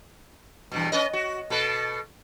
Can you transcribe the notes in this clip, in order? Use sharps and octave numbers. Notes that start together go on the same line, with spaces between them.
E2 G2 B2
C#4 B4 D#5
F#4
B2 A4 B4